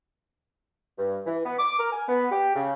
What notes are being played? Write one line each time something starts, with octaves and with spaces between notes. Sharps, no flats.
G2
E3
B3
D6
A#4
G#5
B3
G4
C#3